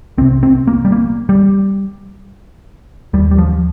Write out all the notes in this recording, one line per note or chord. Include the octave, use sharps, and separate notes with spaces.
C2 C3 C4
C4
A#3
G3
A#3
G3
D#2 G3
G3
F3